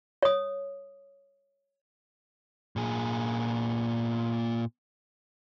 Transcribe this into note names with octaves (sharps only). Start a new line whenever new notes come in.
C#5 D#6
A#2 G#4